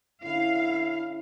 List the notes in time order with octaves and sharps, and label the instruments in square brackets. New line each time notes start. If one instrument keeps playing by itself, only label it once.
[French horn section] D3 C#4 E4 [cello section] F5